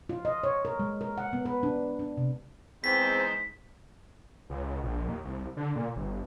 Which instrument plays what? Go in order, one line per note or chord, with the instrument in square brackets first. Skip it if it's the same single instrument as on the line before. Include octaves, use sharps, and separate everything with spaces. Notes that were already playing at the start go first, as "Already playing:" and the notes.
[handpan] F4
D#5
C#5
A#4
G#3
A#4
F#5
B3
B4
D4
D4
C3
[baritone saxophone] E2 [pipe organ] G#3 D#4 C5 [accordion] C4 [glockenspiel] B6
[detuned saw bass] C#2
A#1
D#2
C2
D3
A#2
G1